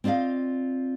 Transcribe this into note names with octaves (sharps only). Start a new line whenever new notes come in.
C4 F4 D5 D#5 F5